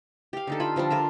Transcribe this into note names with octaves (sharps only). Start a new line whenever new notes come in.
G4 F5
D3 D#4 A4
F4 B5
D3 F3 G3 D4
F4 A#4 E5